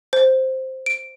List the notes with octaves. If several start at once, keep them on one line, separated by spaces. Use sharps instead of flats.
C5
D7